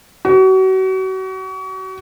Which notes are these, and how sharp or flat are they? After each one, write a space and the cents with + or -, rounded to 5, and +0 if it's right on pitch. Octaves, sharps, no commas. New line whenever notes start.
F#4 +35